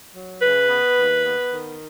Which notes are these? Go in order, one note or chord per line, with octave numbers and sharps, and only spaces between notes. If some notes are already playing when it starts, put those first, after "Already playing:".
F#3
C#3 B4
B3
D#2
B3
D#3